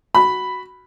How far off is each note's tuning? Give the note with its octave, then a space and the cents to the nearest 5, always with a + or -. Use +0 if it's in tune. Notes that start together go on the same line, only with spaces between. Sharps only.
F#4 +0 B5 +0